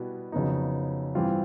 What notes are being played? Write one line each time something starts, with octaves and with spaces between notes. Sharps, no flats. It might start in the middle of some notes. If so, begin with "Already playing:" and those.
Already playing: B2 G3 B3 E4
F2 C#3 F#3 B3 D#4
G2 E3 G3 C4 F4